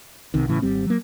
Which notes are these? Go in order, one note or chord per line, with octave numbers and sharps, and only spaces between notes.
B1 C3 D#3
A2 C#3 E3
G#1 G3 C4
F#3 A#3